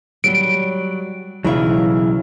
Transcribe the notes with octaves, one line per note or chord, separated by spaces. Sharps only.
F#3 G3 D7
B1 F#2 C#3 E3 F#3 E4 E5 F5